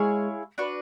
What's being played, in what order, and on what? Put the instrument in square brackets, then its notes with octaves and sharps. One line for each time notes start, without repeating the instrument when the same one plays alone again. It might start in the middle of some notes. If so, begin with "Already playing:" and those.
Already playing: [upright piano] G#3 [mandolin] E4 G#4 C#5 F5
[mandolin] D4 F#4 B4